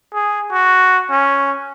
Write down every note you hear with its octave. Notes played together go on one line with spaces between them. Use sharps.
G#4
F#4
C#4